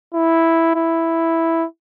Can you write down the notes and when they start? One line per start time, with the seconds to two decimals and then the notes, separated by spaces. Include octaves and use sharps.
0.14 E4
0.76 E4